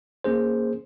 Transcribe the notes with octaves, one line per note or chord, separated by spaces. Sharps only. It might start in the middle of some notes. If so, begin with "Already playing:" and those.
A#3 C#4 G#4 C5